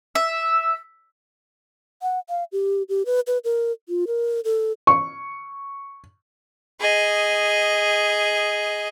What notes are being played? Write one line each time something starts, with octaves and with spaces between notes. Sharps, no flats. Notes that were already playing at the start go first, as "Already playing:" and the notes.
E5 E6
F#5
F5
G4
G4
B4
B4
A#4
F4
A#4
A4
C#6
G#4 D#5